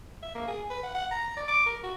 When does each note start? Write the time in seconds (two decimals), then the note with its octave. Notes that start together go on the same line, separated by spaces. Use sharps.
0.22 E5
0.35 A#3
0.48 G#4
0.70 B4
0.83 F#5
0.95 F#5
1.11 A#5
1.37 D5
1.48 D6
1.66 A#4
1.83 F#4